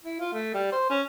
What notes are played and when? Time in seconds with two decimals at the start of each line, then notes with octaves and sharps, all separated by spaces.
0.04 E4
0.20 F4
0.34 A3
0.54 G3
0.73 C5
0.90 C#4